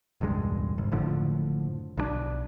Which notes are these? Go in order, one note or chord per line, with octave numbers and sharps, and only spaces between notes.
E1 C#2 G2 G#3
G#1
F#1 A2 D3 F3
B1 E3 D4